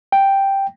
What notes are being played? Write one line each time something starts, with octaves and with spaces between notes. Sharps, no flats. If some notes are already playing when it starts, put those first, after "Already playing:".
G5